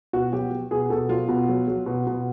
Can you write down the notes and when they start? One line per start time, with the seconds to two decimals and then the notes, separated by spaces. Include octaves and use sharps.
0.13 B2 F#4
0.33 F#3 G4
0.52 F#3
0.71 B2 G#4
0.90 B2 A4
1.09 F#3 F4
1.29 B2
1.49 F#3
1.68 F#3
1.86 B2
2.07 B2